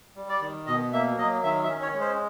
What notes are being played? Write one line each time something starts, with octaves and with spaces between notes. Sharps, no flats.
G3
D5
D#3
B2 D#5
A#3 E5
F#3 D#5
D#3 E5
E5
C#4
C#5
G#3
C5